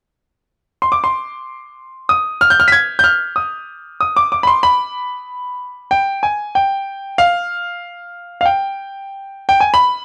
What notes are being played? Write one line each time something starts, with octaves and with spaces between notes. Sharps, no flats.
C6
D6
C6
D#6
F6
G6
F6
B6
G#6
G6
F6
D#6
D#6
D6
D6
B5
C6
B5
G5
G#5
G5
F5
F5
G5
G5
G#5
B5